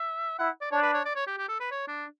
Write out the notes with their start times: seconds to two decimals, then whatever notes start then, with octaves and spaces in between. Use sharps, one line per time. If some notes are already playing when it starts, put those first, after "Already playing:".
Already playing: E5
0.38 E4 F#5
0.61 D5
0.71 D4 C#5
0.83 B4
0.94 C#5
1.05 D5
1.16 C#5
1.27 G4
1.38 G4
1.49 A4
1.60 B4
1.71 C#5
1.88 D4